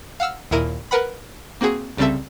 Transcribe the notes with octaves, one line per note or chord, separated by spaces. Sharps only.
F5 F#5 E6 F6
D#2 A#2 E4 A#4 D#7
A#4 B4 F#5 B5
A#3 C4 F#4 G#4
C2 C#3 G3 C4 A4 E5